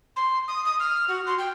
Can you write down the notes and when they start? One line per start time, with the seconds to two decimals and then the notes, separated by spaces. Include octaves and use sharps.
0.16 C6
0.48 D#6
0.65 D#6
0.80 F6
1.08 F#4
1.26 C6
1.39 G5